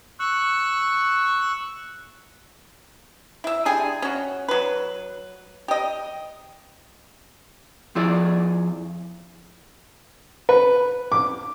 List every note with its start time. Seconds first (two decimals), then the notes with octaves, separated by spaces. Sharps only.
0.20 C#6 E6 F#6
3.44 E4 E5
3.65 D3 G3 G#4 G#5
4.02 C#4 F#4
4.49 F#3 B4
5.68 G4 D#5
7.95 F2 F3 E4 G#4 D5
10.49 B4
11.12 D6